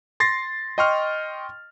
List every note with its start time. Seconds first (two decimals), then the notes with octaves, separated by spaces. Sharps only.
0.20 C6 A6 A#6 C7
0.78 D#5 G5 C6 C#6 F6